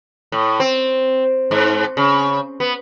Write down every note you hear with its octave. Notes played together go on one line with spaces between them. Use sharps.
A2
C4
G#2
C#3
B3